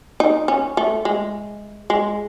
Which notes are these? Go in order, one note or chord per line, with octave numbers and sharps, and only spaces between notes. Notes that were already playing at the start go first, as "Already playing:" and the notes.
D#4
C#4
A3
G#3
G#3